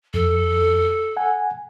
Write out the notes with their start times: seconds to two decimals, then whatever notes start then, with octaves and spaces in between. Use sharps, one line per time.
0.14 F2 A4
1.17 F#5 G#5